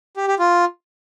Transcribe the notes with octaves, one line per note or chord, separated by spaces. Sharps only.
G4
G4
F4